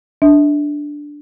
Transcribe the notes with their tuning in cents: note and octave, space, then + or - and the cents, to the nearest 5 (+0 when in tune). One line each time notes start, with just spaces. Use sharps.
D4 +0 E5 -35